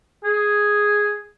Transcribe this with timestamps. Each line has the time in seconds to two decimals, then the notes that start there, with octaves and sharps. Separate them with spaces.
0.23 G#4